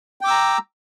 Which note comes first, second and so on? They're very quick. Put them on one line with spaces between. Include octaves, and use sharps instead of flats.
G5 D6 E6 A#5